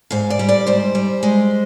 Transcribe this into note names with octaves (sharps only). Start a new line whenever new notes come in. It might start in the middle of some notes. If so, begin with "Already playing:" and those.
G#2 F5
D5
G3
D5
G#2 C5
G3
G#3